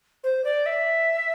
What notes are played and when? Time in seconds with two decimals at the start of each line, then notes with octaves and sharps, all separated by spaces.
0.24 C5
0.44 D5
0.66 E5